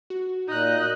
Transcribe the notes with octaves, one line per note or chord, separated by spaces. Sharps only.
F#4
A#2 D#4 D#5 F#6